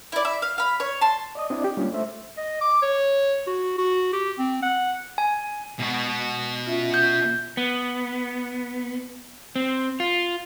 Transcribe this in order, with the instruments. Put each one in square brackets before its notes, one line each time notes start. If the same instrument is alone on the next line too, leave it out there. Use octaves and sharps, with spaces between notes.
[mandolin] E4 D5
E5 B5
F5
F5 B5
C#5
A5 C6
[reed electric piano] D5 D#5 D#6
C4 D4 E4 D5 D#5
G4
G3 G#3 A#3 C#4 D4 F4
A3 C5 E5
[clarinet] D#5
D6
C#5
F#4
F#4
G4
C4
F#5
[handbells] G#5
[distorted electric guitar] B2 F#4 [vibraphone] G#3
[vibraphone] C#4 F4 E5
[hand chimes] G6
[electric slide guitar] B3
C4
F4